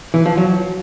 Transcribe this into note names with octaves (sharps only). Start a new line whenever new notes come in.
E3
F3
F#3